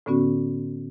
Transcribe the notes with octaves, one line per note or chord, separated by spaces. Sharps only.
A2 D3 B3 C#4 F#4